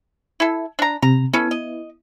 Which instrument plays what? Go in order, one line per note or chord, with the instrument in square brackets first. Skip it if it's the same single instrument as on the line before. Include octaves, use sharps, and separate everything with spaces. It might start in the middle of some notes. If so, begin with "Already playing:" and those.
[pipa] E4 A4
D4 A#5
[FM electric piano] C3 [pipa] A#5
[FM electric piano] B3 E4 [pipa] C#4 A4 B4
[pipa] D#5